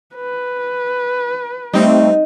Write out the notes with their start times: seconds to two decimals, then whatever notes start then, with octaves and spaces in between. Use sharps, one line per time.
0.16 B4
1.73 G3 A3 C4 D#4